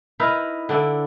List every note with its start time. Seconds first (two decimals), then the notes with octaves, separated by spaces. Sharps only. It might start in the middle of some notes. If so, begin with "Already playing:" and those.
0.20 D#4 E4 A#4 B4
0.69 D3 D4 E4